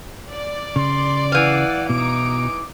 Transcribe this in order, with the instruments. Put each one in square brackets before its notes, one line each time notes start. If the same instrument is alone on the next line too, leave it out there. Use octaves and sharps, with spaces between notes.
[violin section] D5
[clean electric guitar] C#3 [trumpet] C6
[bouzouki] E3 F5 [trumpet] F#5
[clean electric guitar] B2 [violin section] D#4 D7 [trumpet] D6